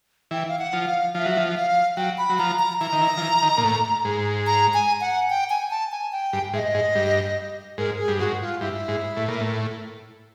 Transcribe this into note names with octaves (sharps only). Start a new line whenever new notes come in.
E3 G5
F5
F#5
F3
F5
F3 F5
E5
F#3
F3
F5
F#3 G5
B5
F#3
F3 A#5
A#5
E3 A#5
D#3
E3
F3
E3
D#3
A#2
A2
G#2
A#5
G#5
F#5
G5
G#5
A5
G#5
G5
G2
G#2 E5
D#5
G#2
G2
G#2 A#4
G#4
G2
G#2 F#4
F4
G2 E4
G#2
A2
A#2
A2